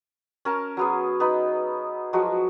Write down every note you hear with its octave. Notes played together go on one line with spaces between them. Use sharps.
C#4 A#4 A5
F#3 B3 G#4
B3 D#4 B4
F3 F#3 G#3 F#4